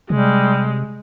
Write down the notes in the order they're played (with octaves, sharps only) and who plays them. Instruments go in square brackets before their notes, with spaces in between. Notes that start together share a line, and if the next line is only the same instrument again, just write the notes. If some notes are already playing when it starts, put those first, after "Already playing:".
[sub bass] C3 [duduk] G3 [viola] G#3